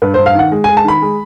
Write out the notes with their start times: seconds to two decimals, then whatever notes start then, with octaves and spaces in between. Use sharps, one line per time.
0.02 G2 B4
0.14 G2 C5
0.26 F5
0.35 D#3 F#5
0.52 G#3
0.64 G#5
0.68 G#3
0.77 A5
0.84 D#3 B5
1.02 G#3